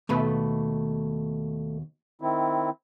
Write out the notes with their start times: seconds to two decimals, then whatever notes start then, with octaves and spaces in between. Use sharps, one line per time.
0.09 D#2 B2 A3 B4
2.21 D#3 C4 E4